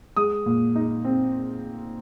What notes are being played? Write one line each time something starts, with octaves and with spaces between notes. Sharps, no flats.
G#3 D#6
A#2
D#4
C4